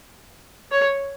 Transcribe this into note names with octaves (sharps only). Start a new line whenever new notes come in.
C#5